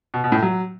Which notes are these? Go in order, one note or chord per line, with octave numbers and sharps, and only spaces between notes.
B2
B2
A2
F#3